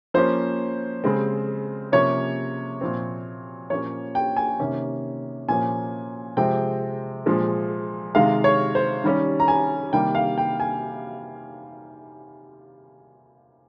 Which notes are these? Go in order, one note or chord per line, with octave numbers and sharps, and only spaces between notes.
F3 A#3 C#4 C5
C#3 G#3 C4
C3 F3 A#3 C#4 C#5
A#2 F3 C4
A#2 F3 A#3 C#4 C#5
G5
G#5
C3 D#3 A#3 C#4
A#2 F3 A#3 C#4 G#5
C3 F3 G#3 C4 G5
A#2 F3 G#3
C3 D#3 G#3 F5
C#5
C5
D#3 G3 C#4
A#5
G#5
C3 D#3 G3 A#3 G5
F5
G5
G#5